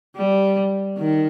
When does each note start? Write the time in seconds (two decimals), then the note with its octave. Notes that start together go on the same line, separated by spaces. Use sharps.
0.16 G3
0.98 D#3